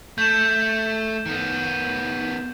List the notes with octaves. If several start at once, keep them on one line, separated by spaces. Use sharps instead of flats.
A3 G6 E7
D#3 B3